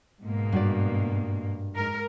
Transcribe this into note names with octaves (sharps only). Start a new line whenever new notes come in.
G#2 B2 A#3
G2 F#4 D5
G#2 A#4